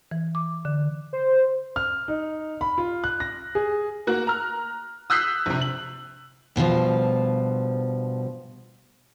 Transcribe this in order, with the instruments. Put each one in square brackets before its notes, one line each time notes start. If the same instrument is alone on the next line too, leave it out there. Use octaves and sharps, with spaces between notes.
[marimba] E3
D6
D3
[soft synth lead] C5
[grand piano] F6
D#4
B5
F4
F#6
A#6
G#4
[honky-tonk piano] A#3 F#4 F#6
A#5 F6
D#6 E6 F#6 G6 B6 C7
A#1 C3
F#7
[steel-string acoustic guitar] G2 B2 E3 F3